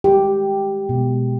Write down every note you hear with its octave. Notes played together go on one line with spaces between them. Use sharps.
D#3 G#3 G4
B2 G#3